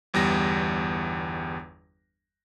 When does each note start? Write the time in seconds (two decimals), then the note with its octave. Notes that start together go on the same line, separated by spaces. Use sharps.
0.14 G1 E2 G3 A#6